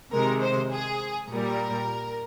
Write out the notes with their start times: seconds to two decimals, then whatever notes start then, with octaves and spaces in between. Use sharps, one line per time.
0.12 C3 D#3 G#3 A#4
0.42 C5
0.72 G#4
1.30 A#2 G3 A#4